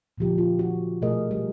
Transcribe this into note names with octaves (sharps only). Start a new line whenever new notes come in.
A#2 D3 F3 G4
F4
F#4
B2 A3 G#4 A#4 D#5
G3